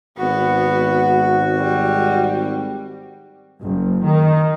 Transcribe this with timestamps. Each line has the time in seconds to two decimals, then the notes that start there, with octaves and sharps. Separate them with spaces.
0.18 G#1 B3 F#4
1.56 G3
3.61 F#1
4.05 D#3